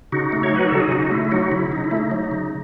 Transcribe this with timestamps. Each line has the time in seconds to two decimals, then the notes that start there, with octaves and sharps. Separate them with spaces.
0.12 C#3 D#4 F#4
0.32 A3
0.43 C#5
0.52 F#3 B4
0.68 C#3 A4
0.80 G#4
0.92 C#3 D#4 F#4
1.06 F#4
1.11 A3 E4
1.25 E4
1.32 F#3 D#4 F#4
1.51 C#3 E4
1.72 C#3 D#4
1.84 E4
1.91 A3
1.97 D#4
2.11 F#3
2.31 C#3